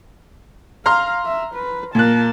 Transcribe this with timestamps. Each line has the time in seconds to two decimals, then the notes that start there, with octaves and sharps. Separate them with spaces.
0.86 F5 A#5 C6 F6
1.25 E5
1.55 B4
1.95 A#2 A#3 A5 F#6